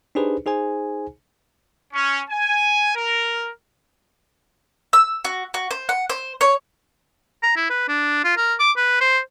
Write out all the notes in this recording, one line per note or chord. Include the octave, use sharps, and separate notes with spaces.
D4 D#4 G4 G#4 B4 C5
D#4 G#4 C5 G#5
C#4
G#5
A#4
E6
F#4
F#4
C5
F#5
C5
C#5
A#5
E4
B4
D4
F4
A#4
D6
B4
C5